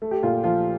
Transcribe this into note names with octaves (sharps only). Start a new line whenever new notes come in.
A3
G4
A#2 F4
F3 F4